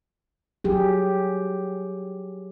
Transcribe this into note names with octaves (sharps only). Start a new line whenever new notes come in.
F#3 G4 G#4